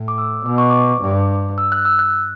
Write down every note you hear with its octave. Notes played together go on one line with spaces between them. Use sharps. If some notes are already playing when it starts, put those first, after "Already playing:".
Already playing: A2
D6
E6
B2 D6
C#6
D6
G2
E6
F#6
E6
F#6